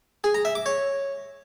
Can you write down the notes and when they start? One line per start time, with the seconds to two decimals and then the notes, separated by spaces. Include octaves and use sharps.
0.24 G#4
0.35 A#5
0.45 E5
0.55 D6
0.66 C#5